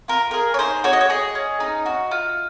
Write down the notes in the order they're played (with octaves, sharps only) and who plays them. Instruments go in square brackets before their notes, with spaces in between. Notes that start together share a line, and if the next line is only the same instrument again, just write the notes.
[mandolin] F4 A#4
G#4 A#4
C#5
D#4 C5
F#4 C#5
D#5
C#5
G#4 D#5
C#4
D#4
F#4
F4